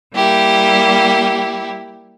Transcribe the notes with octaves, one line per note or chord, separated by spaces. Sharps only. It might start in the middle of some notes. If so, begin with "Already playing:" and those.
G3 A#3 E4 G4